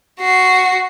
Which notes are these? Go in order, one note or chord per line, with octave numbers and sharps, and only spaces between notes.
F#4 C7